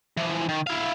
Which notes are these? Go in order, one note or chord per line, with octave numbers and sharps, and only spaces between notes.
E3 F3
D#3
E4 F5